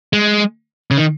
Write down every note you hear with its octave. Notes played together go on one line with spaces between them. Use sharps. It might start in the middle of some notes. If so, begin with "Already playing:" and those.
G#3
C#3
D#3